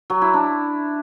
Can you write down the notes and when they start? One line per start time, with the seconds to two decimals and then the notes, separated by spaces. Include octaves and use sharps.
0.10 F#3
0.22 E4
0.34 D4